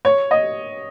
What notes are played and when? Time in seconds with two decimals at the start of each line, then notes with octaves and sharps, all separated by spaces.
0.05 C#5
0.31 D#5